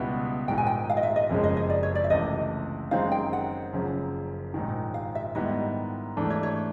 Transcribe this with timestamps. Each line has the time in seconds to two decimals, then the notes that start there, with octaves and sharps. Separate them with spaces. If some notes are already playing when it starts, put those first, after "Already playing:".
Already playing: C#2 B2 G3 B3 E4
0.48 A#1 G#2 D#3 G5
0.58 G#5
0.66 G5
0.89 F5
0.97 D#5
1.03 E5
1.16 D#5
1.30 F#1 F2 C#3 F3 G#3
1.44 D#5
1.57 D#5
1.70 D5
1.83 C#5
1.95 D5
2.04 E5
2.10 C#2 C3 E3 A3 D#5
2.91 F#2 D#3 G#3 C4 D#4 F5
3.12 G5
3.33 F#5
3.73 F#1 F#2 C#3 F3
4.54 A#1 G#2 D#3
4.94 F5
5.15 E5
5.35 G#2 D#3 G3 B3 E4 D#5
6.17 G#2 E3 A3 D4
6.30 C#5
6.43 C#5